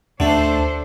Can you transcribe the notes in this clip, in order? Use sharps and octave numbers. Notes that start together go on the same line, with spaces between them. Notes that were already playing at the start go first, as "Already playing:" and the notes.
D2 D3 A3 D4 A4 C5